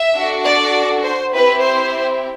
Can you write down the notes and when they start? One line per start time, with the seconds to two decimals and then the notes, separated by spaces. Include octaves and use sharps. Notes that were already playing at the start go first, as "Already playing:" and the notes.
Already playing: E5
0.14 D4 F#4 A4
0.44 D5
1.03 C5
1.32 C4 E4 G4 B4
1.61 C5